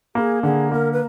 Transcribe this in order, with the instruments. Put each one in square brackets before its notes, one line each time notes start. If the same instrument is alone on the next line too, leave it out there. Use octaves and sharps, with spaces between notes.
[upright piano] A#3 [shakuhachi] G#4
[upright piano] D3 [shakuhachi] G#4
[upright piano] A#3 [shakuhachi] A#4
[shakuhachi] B4